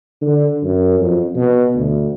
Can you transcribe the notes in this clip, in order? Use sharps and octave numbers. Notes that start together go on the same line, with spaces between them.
D3
F#2
F2
B2
D2